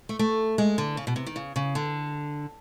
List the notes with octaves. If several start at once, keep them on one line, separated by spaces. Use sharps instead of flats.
A3
A3
G#3
D3
C#3
B2
C3
D#3
C#3
C#3
D3